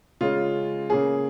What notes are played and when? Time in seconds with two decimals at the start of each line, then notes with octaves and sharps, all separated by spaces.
0.21 C#3 G#3 C#4 F4
0.90 C#3 A#3 C#4 G#4